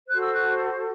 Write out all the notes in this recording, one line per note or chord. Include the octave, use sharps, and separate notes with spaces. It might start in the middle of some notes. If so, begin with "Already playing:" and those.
F#4 A4 C5 F#6
E6
F#6